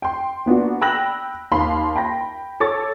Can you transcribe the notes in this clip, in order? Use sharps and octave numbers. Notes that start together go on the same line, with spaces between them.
G5 C6
A#3 B3 D4 F#4
G5 B5 E6 F#6 A#6 F#7
D#2 F5 B5 C6
G5 B5 A#6
A4 C#5 D6 A6